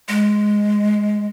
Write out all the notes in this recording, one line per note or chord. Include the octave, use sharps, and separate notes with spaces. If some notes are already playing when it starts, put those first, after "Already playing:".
G#3